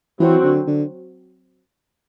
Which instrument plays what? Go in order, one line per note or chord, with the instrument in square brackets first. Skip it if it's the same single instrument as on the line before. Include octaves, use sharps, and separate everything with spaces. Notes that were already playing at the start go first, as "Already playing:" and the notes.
[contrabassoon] E3 [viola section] F#3 C4 F#4
[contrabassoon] D3
D3